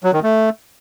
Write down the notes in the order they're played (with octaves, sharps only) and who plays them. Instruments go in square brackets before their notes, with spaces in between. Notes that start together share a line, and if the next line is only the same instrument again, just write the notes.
[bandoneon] F#3
D#3
A3